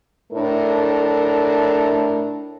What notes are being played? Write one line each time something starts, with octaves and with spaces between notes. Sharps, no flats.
A2 A3 D4 A#4